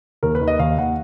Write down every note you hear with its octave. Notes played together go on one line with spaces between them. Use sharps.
D#2 A#4
B4
D#3
D#5
D#2 F5
D#2 F#5